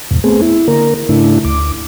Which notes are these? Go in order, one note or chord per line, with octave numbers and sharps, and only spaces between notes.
E2 A2 C3
A3 B3 C4 G#4
E4
D3 A#3 A#4
G#2 C#3 A3 D4 E4
D2 D6